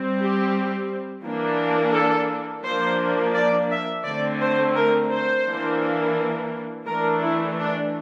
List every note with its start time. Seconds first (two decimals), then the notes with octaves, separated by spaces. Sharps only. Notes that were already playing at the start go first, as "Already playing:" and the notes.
Already playing: G3 C4
0.19 G4
1.24 E3 A#3 D4
1.94 A4
2.64 F3 A#3 D4 C5
3.35 D5
3.71 E5
4.05 D3 A3 C4 D5
4.41 C5
4.77 A#4
5.11 C5
5.46 E3 A#3 D4
6.87 E3 A3 D4 A#4
7.22 E4
7.58 D4